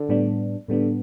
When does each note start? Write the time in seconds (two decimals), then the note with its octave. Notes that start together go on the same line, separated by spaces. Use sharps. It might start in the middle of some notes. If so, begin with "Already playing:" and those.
Already playing: D3
0.09 A2 G3 B3 D4
0.68 A2 D3 G3 B3 D4